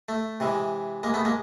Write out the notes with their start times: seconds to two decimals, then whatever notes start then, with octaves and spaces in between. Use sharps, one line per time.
0.09 A3
0.40 C3 E3 G#3
1.03 G#3 A#3
1.14 A3 B3
1.25 G#3 A#3